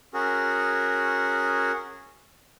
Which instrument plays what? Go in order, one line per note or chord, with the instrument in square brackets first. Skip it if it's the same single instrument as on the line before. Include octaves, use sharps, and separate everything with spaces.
[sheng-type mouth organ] C#4 F#4 G#4 A#4